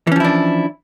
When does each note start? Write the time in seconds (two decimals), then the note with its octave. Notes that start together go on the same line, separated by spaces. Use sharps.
0.07 E3
0.12 C#4
0.16 F3
0.20 E4
0.24 D4